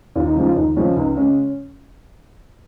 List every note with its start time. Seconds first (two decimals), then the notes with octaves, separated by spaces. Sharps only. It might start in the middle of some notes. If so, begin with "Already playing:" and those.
0.15 D#2 F4
0.25 D#4
0.36 C#3 F3 G#3 D#4
0.46 F4
0.56 D#2 D#4
0.76 C#3 F3 G#3 C#4
0.97 C#2 D#4
1.16 C#3 G#3 C#4